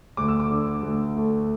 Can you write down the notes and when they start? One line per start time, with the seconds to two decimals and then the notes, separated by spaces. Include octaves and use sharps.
0.17 D2 D6
0.28 E6
0.40 D6
0.51 D3
0.83 D2
1.16 A3